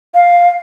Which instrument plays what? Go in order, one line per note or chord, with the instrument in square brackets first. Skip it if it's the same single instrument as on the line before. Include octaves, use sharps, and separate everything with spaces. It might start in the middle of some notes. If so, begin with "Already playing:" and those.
[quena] F5